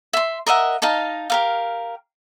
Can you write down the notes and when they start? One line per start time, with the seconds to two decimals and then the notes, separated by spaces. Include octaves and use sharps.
0.13 E5 C6
0.46 A#4 D#5 E5 F#5
0.82 D#4 D#5 F5 A5
1.30 G4 A#4 F5